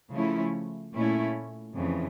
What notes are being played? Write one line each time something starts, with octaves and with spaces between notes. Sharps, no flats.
C#3 F3 A3 C#4 E4
A#2 A3 C#4 E4
F2 C#3 E3